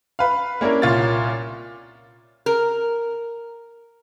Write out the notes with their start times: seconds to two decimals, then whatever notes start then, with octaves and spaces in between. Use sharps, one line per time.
0.19 B4 F5
0.61 A#3 C#4 D4 E4 A#4
0.82 C2 A#2 F4 C#5 A6
2.46 A#4